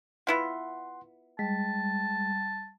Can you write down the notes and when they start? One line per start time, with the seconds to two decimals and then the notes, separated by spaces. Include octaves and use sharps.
0.27 B3 E4 F4 F#5 C6
1.39 G3 G#3 A5